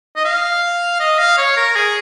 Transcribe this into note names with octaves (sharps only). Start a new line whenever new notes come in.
D#5
F5
D#5
F5
C#5
A#4
G#4